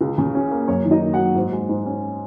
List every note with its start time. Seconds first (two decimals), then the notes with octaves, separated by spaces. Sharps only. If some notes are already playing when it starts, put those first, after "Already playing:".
0.01 C#2
0.18 C#3
0.35 C#4
0.51 A#3
0.68 F#2 C#5
0.85 D#3
0.91 D#4 D#5
1.01 A#3
1.13 F#4 F#5
1.19 F#3
1.35 G#2
1.52 G#3
1.69 G#2
1.86 C#4